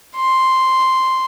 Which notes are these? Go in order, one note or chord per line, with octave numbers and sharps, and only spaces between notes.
C6